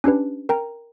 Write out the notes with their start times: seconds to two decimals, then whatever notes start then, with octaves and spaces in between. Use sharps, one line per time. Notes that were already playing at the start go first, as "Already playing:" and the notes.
0.04 C#4 D4 G4 B4
0.49 A#4 G5 A#5